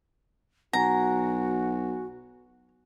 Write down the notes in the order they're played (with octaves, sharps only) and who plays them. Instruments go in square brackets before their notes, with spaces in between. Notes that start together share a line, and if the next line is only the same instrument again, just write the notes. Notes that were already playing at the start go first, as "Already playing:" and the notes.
[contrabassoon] B1 [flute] F#4 [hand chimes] F#5 G#5 [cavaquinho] A#5